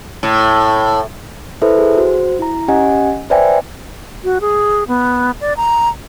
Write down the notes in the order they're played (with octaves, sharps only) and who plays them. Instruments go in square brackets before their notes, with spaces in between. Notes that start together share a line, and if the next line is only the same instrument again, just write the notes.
[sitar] A2
[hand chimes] E4 A4 B4 C5 E5
G#4
F#4 C5
E4 A#5
C#4 G4 D#5 F#5 G#5
B4 C5 D5 E5 G5 G#5
[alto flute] F#4
G#4
B3
D5
A#5